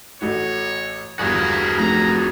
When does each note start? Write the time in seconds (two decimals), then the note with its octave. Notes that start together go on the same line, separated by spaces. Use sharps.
0.21 A1 A3 F#4 C#5
1.19 G1 E2 G3 A#3 F#4 G#4 B4
1.78 F1 A#5